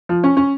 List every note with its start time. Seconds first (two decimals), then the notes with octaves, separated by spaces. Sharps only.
0.09 F3
0.24 C#4
0.37 C#4